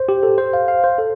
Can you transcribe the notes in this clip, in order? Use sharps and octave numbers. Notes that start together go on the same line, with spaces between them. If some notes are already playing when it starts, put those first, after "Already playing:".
Already playing: C5
G4
A4
C5
F5
F5
C5
A4